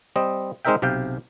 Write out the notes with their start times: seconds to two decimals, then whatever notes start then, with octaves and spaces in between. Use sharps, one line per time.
0.16 G3 C4 D#5
0.65 G#3 C4 D#4 A#4 E5 G5
0.82 B1 C3 G4 F5 G5